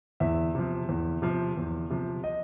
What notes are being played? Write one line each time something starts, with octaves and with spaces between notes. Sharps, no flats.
E2 E5
C3 F3
E2
C3 F3
E2
C3 F3
D#5